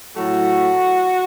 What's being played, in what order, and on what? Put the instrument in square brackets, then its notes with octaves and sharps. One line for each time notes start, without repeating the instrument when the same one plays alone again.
[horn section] A2 F#3 A3 F#4